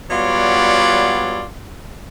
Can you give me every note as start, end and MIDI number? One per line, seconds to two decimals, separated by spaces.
0.10 1.43 54
0.10 1.43 55
0.10 1.43 59
0.10 1.43 65
0.10 1.43 73
0.10 1.43 74